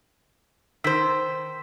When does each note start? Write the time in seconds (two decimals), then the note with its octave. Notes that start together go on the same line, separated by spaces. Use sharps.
0.84 D#3 C5 E6 B6